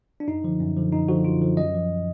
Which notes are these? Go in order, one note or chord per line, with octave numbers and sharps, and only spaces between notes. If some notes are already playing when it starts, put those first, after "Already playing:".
D4
F#2 D#4
D3 F3
F#2
D3 F3
F#2 D#4
D3 F3 F#4
F#2 F4
D3 F3
F#2 D#5
F3